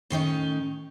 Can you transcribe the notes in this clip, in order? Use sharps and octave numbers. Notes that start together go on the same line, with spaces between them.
A2 D#3 C#4 D#4